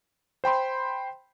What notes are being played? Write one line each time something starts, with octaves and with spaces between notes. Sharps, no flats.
C5 G5 B5 C6